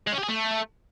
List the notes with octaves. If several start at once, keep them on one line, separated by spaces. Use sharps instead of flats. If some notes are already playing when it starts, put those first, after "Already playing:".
G#3
C#4
G4
G#4
A3